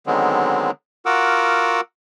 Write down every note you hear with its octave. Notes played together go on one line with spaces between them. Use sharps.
D3 D#3 F#3 G#3 B3 C4
F4 F#4 A#4 F#5 D6 E6